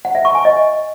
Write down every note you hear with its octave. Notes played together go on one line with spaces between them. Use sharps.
F#5
E5
C#6
G#5
D#5